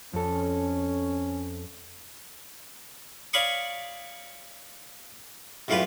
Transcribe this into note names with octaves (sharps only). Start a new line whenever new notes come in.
F2 C#4 A4
C#5 D5 F5 B5 C#6 D#6
C2 F#2 A2 F4 G4 B4